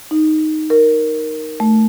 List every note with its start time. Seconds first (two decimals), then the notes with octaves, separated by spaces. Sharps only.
0.11 D#4
0.70 A#4
1.60 A3